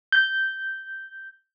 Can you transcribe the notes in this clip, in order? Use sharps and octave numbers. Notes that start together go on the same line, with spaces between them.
G6